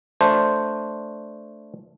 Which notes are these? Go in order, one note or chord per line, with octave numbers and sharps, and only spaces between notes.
A3 D4 C5